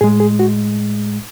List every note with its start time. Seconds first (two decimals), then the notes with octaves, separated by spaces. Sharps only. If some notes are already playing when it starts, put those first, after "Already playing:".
0.01 A2 G#3 G#4
0.20 G#4
0.39 F#4